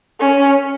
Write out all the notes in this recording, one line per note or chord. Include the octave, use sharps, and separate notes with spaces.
C#4